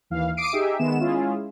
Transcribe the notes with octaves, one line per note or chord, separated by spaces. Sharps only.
D#2 E3 F5
D6 D#6 C7 D7 D#7
D#4 G4 G#4 E5
D#3 G#3 B3 E7
G#3 C#4 E4 F4 G#4